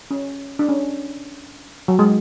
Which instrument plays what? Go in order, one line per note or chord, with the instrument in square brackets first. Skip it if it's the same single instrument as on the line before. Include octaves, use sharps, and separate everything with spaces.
[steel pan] C#4
D4
C#4
F#3
G#3